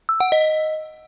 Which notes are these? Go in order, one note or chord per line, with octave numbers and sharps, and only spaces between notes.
E6
F#5
D#5